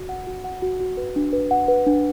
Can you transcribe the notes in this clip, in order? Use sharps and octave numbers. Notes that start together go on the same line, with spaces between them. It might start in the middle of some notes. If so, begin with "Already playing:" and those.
Already playing: F#4
F#5
F#4
F#5
F#4
F#4
B4
D4
B4
F#5
B4
D4